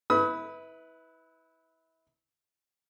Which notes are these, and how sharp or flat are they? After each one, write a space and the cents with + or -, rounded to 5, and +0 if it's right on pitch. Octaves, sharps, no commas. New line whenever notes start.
E4 -30 B4 +0 D#6 +40